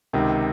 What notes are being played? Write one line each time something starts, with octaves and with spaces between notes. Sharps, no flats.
C#2 C3 D#3